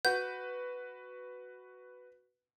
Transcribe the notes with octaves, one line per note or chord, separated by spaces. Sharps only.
F#4 B4 F#5 G6